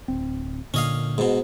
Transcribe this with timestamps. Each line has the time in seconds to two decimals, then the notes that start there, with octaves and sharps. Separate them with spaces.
0.08 D1 C4
0.74 A#2 D3 C#4 D#5 F5
1.18 G#2 B2